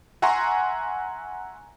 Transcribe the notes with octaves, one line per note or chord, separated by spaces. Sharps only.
E5 F#5 G#5 A#5 C6 C#6